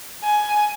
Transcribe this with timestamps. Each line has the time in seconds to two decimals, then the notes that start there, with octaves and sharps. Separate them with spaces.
0.23 G#5